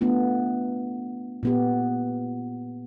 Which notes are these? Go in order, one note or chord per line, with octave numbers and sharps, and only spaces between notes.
A3 B3 D4 F4
A#2 B3 G4